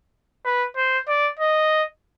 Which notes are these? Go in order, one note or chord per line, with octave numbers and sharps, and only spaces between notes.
B4
C5
D5
D#5